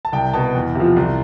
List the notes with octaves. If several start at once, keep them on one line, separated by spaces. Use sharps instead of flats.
A5
C2 G5
B2 A5
E2
C3 F3
C2